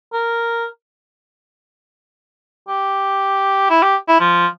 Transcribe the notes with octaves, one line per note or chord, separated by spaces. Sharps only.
A#4
G4
E4
G4
E4
F3